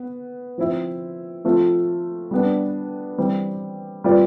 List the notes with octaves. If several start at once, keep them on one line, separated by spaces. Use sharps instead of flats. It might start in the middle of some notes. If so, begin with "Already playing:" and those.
Already playing: B3
F3 C4 E4
F3 A3 C4 F4
G3 B3 D4
E3 G3 C4
G3 C4 F4 B4 D5